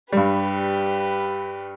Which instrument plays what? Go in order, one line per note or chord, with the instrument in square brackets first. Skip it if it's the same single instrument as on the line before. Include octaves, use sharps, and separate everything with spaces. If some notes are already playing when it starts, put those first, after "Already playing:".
[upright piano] G2 G3 [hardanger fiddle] G4 B4